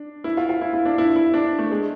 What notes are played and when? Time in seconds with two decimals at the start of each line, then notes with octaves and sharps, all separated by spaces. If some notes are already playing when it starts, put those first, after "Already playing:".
Already playing: D4
0.24 E4
0.37 F4
0.49 F4
0.61 E4
0.73 E4
0.85 D4
0.98 E4
1.16 E4
1.34 D4
1.59 A3
1.71 G#3